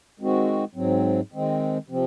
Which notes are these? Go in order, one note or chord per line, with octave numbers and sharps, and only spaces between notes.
D#3 G#3 C4 F#4
G#2 F#3 C4
D#3 G#3 C4
C3 F3 C4